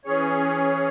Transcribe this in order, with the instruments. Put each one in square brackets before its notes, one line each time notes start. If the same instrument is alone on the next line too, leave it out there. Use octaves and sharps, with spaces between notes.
[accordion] E3 C#4 G#4 C#5